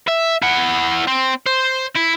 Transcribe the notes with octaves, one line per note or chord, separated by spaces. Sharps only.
E5
E4 F#5
C4
C5
E4